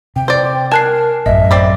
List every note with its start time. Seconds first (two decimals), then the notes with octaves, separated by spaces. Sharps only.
0.16 C3 G5
0.28 C5 D5
0.72 A#4 G#5 A5 F#6 C7
1.26 A1 F#2 D#5 E5
1.51 C4 D5 B5